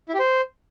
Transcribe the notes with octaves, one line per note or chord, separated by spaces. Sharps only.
E4
G4
C5